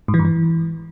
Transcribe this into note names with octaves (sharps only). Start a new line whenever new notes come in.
G#2
E3
G2
E3